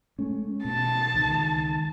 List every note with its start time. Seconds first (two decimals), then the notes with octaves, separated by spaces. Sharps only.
0.19 G#3 A3 C#4
0.65 B2 A5
1.14 C#2 D#3